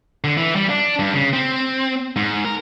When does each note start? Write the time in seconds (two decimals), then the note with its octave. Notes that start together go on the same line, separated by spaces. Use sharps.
0.24 D3
0.37 E3
0.56 G3
0.70 D4
0.99 G2
1.13 C#3
1.33 C4
2.16 G#2
2.45 A#4